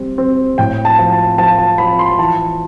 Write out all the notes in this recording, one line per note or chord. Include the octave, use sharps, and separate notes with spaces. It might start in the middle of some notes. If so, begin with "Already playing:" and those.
Already playing: G3 C4
C4
A2 G5
A5
F3
A5
F3 A5
A5
F3 B5
C6
E3 A5